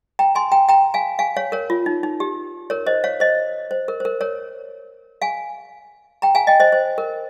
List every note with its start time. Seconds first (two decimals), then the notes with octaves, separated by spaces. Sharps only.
0.19 G5 A#5
0.35 G#5 C6
0.52 G5 A#5
0.69 G5 A#5
0.94 F5 G#5
1.19 F5 G#5
1.36 C#5 F5
1.52 A#4 C#5
1.70 F4
1.86 D#4
2.03 D#4
2.20 G4
2.70 A#4 C#5
2.86 C5 D#5
3.04 C#5 F5
3.20 C5 D#5
3.71 C5
3.88 A#4
4.00 C5
4.05 A#4
4.21 A#4 C#5
5.22 F5 G#5
6.22 G5 A#5
6.35 F5 G#5
6.47 D#5 G5
6.60 C5 D#5
6.72 C5
6.98 A#4